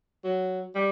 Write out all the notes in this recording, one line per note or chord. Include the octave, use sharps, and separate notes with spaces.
F#3
G3